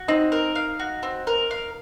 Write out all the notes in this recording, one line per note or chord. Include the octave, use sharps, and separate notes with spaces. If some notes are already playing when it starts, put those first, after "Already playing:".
Already playing: F#4
C4 D#4 D#5
A#4
F5
F#4
C4
A#4
F5